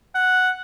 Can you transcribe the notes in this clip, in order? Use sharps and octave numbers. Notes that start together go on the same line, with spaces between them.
F#5